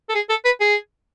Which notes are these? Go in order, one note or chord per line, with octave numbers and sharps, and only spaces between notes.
A4
G#4
A4
B4
G#4